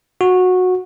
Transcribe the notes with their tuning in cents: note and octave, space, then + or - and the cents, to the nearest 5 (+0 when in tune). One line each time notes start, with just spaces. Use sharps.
F#4 -15